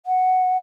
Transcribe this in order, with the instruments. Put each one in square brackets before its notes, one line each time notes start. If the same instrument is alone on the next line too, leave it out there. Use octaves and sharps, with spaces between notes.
[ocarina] F#5